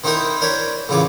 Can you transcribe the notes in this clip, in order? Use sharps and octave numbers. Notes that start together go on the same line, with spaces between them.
D#3 C4 D#4 E4 A#4 C5
D4 A#4 C5 C#5 B5
A1 C#3 E3 F4 D6